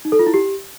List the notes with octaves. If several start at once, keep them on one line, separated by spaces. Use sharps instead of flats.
D#4
A4
F4
E4
G4